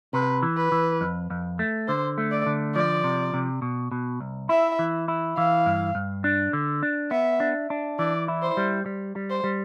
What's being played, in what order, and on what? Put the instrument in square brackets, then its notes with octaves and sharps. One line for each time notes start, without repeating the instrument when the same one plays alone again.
[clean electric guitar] C3 [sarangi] B4
[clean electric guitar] E3
[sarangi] B4
[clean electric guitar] E3
F2
F2
A3
[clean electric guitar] D3 [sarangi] C5
[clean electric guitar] A3
[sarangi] D5
[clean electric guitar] D3
[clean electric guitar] F3 [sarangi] D5
[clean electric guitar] C3
C3
B2
B2
C2
[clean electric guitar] E4 [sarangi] E5
[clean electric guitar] E3
E4
[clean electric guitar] E3 [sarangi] F5
[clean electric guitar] G2
G2
D4
D3
D4
[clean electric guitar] B3 [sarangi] E5
[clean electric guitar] D4
D4
[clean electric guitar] E3 [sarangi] D5
[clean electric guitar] E4
[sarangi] C5
[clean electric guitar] G3
G3
G3
[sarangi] C5
[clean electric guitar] G3